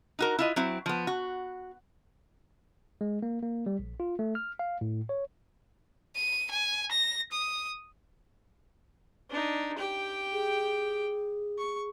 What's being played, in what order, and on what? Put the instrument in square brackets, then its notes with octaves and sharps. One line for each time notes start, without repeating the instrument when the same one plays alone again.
[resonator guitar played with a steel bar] D#4 F#4 A#4
E4 F4 D#5
F#3 C4 E4
F3 B3
F#4
[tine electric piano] G#3
A#3
A#3
G3
A#1
F4
A3
F6
F5
A2
C#5
[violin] D#7
G#5
A#6
D#6
[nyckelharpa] D4 D#4
G4 G5
[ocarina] G#4
[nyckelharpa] C#6